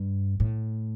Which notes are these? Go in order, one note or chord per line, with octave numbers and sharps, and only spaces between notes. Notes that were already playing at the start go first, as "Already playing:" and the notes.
Already playing: G2
A2